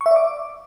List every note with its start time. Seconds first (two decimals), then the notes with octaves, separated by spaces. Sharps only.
0.01 C#6
0.06 E5
0.11 D5
0.16 D6